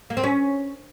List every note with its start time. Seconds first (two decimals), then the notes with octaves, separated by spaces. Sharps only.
0.10 A#3
0.17 C4
0.24 C#4